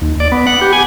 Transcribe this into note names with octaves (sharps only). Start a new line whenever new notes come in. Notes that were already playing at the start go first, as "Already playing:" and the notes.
D#2
D5
B3
F#5
G4
G#5